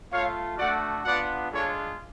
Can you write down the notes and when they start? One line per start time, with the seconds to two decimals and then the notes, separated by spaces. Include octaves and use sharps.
0.10 A3 F4 C#5 F5
0.57 A3 D4 F#4 D5 F#5
1.03 B3 D4 F4 D5 F#5
1.50 G#3 D4 F4 A4 C#5